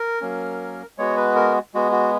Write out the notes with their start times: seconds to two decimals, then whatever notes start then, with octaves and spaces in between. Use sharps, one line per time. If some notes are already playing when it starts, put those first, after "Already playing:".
Already playing: A#4
0.21 F#3 A#3 C#4
0.98 G#3 B3 F#4 C#5
1.17 B4
1.35 A#4
1.74 G#3 B3 F#4
1.92 F#4